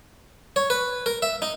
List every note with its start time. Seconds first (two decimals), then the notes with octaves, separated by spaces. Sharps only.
0.56 C#5
0.70 B4
1.06 A#4
1.22 E5
1.42 D#4